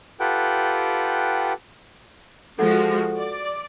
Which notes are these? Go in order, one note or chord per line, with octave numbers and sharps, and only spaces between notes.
F4 G4 A4 B4 F#5 G5
F3 G#3 F#4 A4 F#5
D5